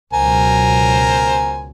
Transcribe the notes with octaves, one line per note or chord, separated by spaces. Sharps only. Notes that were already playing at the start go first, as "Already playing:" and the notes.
C#2 B2 F#3 A#4 C5 G#5